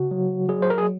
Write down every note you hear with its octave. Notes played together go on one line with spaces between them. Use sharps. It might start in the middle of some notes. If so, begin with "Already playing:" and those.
Already playing: C#3 F#4
F#3
F#3 G#4
C5
A#4
G#4